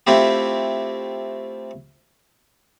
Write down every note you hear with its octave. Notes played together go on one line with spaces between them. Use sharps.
A3 C4 E4 F4 G4